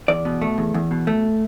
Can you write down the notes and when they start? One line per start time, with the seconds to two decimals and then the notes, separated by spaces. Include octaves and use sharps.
0.08 E2 D5
0.25 B2
0.42 A3
0.58 E2
0.74 E2
0.91 B2
1.07 A3